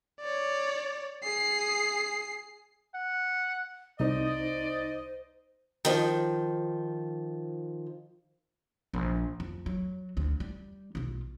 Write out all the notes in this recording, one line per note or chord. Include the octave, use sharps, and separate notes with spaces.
C#5 D5
G#4 C7
F#5
C2 D#4 C5 D5 D#5
D#3 F3
A#1
F2
F#3
D2
G3
B1 F4